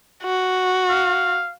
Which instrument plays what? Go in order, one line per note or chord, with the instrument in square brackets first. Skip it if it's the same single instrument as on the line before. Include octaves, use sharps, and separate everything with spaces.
[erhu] F#4
[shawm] F5